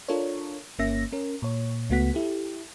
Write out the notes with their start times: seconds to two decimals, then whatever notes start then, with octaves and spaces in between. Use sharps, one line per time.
0.08 D4 F4 A4 A#4 C#5
0.79 G1 A#3 C#4 E5 A#6
1.12 C#4 A#4
1.42 A#2 C#5
1.90 C#2 A3 B3 F#4 F#5 B6
2.14 E4 G4 A4